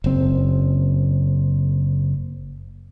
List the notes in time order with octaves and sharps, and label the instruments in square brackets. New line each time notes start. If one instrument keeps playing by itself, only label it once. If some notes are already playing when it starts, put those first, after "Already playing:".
[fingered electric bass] F#1 C4